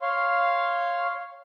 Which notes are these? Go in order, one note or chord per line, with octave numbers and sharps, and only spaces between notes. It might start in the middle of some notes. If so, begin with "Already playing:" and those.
C#5 F5 C6